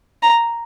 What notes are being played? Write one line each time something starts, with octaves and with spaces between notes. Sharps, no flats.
A#5